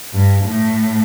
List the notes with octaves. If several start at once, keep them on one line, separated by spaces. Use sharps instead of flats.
G2
A2